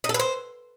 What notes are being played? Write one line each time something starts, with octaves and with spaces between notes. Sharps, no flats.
D#4
A4
B4
C5